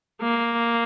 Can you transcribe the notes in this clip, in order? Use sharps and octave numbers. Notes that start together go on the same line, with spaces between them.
A#3